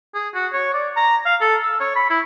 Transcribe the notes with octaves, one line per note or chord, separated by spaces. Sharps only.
G#4
F#4
C#5
D5
A#5
F5
A4
E6
C#5
B5
E4